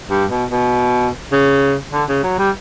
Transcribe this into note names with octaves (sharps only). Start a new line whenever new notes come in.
G2
B2
B2
C#3
D3
C#3
F#3
G3